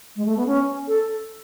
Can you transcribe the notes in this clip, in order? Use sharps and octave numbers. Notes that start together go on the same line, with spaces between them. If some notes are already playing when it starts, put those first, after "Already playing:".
G#3
A3
B3
C#4
A4